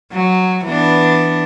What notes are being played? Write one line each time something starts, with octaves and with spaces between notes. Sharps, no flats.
F#3
E3 B3 D4